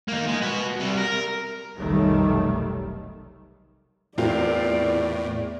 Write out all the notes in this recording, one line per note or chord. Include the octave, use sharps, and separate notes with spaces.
A#3 D#4
G#3
F#4 B4
C3 G3
A#4
F1 B1 D#3 G3 A3
E2 A2 C4 F4 A#4 D5